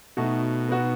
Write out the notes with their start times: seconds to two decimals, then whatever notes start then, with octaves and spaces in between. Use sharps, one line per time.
0.17 B2 A3 D#4 F#4
0.69 B3 D#4 F#4